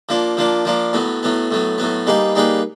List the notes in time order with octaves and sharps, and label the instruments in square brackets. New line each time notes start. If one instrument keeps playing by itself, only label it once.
[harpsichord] F3 A#3 D4
F3 A#3 D4
F3 A#3 D4
A2 F#3 B3
A2 F#3 B3
A2 F#3 B3
A2 F#3 B3
G3 A#3 D#4 G#4 B4
G3 A#3 D#4 G#4 B4